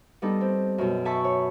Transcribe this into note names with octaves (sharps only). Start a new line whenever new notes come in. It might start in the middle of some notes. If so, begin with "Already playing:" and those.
G3 B3 D#4 A4
C4
F#2 B2
E5 G#5 A5 B5 C#6
C#5